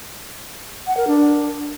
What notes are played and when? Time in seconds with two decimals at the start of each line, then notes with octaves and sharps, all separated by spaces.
0.87 F#5
0.97 A#4
1.07 D4